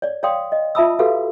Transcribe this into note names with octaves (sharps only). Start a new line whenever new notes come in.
C#5 D5
C#5 D5 F5 G5 C6 D#6
D#5
F4 E5 A5 B5 D#6 E6
F#4 G4 A4 B4 F5